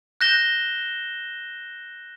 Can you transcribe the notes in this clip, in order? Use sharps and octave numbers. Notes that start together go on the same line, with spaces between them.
F#6 G6 A#6 E7 G7